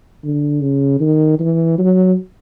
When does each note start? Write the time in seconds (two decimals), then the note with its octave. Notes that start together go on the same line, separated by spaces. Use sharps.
0.23 D3
0.61 C#3
1.00 D#3
1.39 E3
1.78 F#3